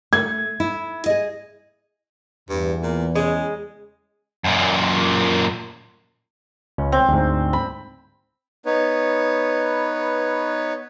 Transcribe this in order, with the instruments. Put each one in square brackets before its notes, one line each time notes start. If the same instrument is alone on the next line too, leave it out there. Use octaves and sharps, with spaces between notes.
[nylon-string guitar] A3 [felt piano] G#6
[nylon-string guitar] E4
G#4 D#5
[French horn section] E2 [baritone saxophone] G2
[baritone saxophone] A#2
[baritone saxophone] C#3 [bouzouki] G#3
[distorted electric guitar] F#2 A#2
[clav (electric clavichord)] C#2 C#4
[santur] C4
[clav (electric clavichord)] D2 G#2
[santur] B5
[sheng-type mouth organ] B3 D#4 B4 C#5